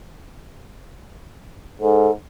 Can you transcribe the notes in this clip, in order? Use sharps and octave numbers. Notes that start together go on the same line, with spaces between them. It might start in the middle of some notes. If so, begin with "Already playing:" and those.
G#2 A4